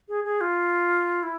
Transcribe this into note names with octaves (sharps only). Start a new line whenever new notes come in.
G#4
G#4
F4
E4